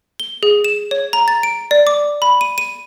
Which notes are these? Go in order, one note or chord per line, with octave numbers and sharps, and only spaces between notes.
G7
G#4
E7
C#5
A#5
A6
D7
D5
D6
B5
D#7
D#7